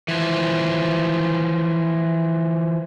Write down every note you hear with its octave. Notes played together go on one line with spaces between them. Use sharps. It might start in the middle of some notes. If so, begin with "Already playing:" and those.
E3 F3